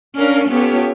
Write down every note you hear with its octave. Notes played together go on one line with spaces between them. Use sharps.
C#4 D4 A#4 F5
B3 C#4 F4 G4 A4 C#5